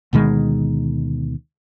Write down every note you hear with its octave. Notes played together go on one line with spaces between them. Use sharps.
D2 B2 D#3 G#3